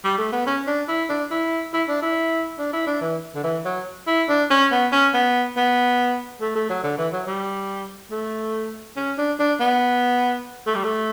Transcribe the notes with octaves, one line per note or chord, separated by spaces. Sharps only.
G3
A3
B3
C#4
D4
E4
D4
E4
E4
D4
E4
D4
E4
D4
E3
D3
E3
F#3
E4
D4
C#4
B3
C#4
B3
B3
A3
A3
F#3
D3
E3
F#3
G3
A3
C#4
D4
D4
B3
A3
G3
A3